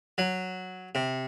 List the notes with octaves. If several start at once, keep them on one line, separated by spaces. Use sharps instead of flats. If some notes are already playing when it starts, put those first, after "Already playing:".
F#3
C3